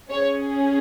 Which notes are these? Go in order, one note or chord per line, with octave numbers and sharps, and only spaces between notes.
C#4 G#4 C#5